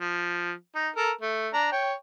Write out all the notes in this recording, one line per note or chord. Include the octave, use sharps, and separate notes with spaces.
F3
D#4
A4 A#4
A3
D4 A#5
C#5 G5